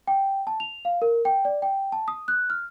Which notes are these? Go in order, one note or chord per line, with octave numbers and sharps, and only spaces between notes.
G5
A5
F7
F5
A#4
G5
D5
G5
A5
D#6
F#6
F6